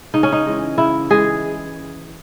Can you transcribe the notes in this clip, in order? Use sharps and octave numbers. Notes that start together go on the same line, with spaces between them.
C#3 D#4
C#4
D#4
E3 G#3
C#3 E4
E3 G#3 G#4